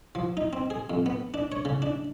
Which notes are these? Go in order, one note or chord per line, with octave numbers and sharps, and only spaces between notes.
F3
D#4
C4
G#4
F2
B3
D4
C#5
C#3
D4